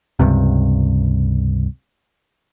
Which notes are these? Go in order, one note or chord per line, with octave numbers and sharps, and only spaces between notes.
C#2 G2 C3